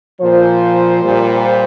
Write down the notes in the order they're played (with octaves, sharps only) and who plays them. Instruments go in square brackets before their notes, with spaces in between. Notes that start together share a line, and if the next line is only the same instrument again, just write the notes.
[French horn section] A#2 F3 C5
A#2 G3